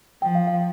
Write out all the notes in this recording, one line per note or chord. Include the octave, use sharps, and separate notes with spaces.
F3 G5
F5
F5